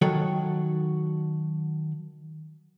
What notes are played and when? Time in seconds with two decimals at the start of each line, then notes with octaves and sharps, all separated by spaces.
0.02 D#3 F#3 F#4 A4 C#5